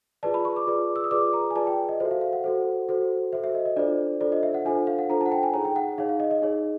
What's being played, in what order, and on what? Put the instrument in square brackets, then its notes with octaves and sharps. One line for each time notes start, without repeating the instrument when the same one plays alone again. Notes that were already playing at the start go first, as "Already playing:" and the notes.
[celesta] F4 G#4 B4 D5 A5
B5
C#6
D6
F4 G#4 B4 D5
E6
D#6
F4 G#4 B4 D5 D6
A#5
G#5
F4 G#4 B4 D5 A5
G5
D#5
F#4 A4 C5 E5
F5
F5
F#5
F#4 A4 C5
F#4 A4 C5
F#4 A4 C5 E5
E5
D#5
D#5
D4 F4 A4 C5 D5
D4 F4 A4 C5 D5
D#5
E5
F#5
D4 F4 A4 C5 G#5
F5
F#5
D4 F4 A4 C5 A#5
F#5 A5
G5
G#5
D#4 G#4 C#5 A#5
G5
F#5
D#4 G#4 C#5 F5
F5
D#5
D#5
D#4 G#4 C#5